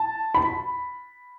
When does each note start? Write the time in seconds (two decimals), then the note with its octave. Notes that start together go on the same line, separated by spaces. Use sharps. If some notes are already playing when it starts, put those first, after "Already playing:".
Already playing: A5
0.35 B5